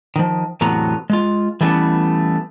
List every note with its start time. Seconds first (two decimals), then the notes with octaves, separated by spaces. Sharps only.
0.16 D#3 F3
0.61 E2 A2 C3 F#3 B3 A#5
1.10 G#3 F4
1.61 E3 G3 A3 B3 C#4 E4